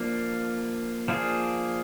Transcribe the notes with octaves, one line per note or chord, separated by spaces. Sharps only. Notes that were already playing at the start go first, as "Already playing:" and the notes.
Already playing: F3 A#3 D4 F4
F3 A#3 D4 F4 G#4